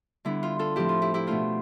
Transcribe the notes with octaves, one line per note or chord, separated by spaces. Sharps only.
D3 G3 B3 D4 E4
F4
F4 A4
A2 F3 C4 E4 G4
F4
E4 G4
E4 G4
B2 A3 D4 F4